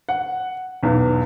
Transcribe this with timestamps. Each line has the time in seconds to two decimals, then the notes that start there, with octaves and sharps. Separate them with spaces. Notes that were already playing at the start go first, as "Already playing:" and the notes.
0.09 F#5
0.83 B1 E2